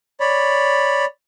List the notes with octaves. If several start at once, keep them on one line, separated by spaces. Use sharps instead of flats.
C#5 D5 B5